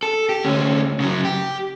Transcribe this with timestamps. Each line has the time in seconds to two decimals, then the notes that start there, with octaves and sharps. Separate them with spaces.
0.03 A4
0.29 G4
0.45 D2 C#4
1.00 C#3 F#3
1.25 G4